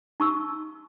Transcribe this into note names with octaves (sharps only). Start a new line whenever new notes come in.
D#4 C#6 E6